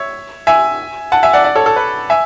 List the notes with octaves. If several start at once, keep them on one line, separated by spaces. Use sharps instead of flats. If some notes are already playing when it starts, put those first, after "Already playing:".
Already playing: C#5 E5
E5 G#5
F#5 A5
E5 G#5
D5 F#5
D5 F#5
A4 C#5
A4
B4
E5 G#5